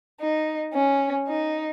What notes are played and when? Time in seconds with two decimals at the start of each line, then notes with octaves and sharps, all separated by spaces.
0.20 D#4
0.74 C#4
1.28 D#4